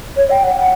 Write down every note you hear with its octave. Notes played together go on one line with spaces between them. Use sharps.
C#5
G5
F#5
F#5